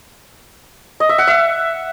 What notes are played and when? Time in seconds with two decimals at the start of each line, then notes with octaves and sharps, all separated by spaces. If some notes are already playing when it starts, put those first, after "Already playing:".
1.00 D#5
1.09 E5
1.18 F#5
1.27 E5